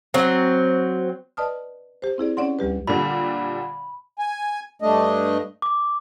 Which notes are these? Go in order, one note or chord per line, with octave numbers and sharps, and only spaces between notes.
F#3 C4
B4 D5 D#5 A5 D#6 F6
G4 C5
C4 E4 G#4 D5
C#4 C#5 D5 F#5 C6
D2 G3 G4 B4
A#2 D3 G3 B5
G#5
G2 A3 D4 D#5
D6